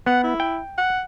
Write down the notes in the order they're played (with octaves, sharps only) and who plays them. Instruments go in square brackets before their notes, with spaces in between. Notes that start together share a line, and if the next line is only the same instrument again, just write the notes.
[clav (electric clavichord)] B3 [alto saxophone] F#5
[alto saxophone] E4
[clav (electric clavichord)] G5
[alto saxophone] F#5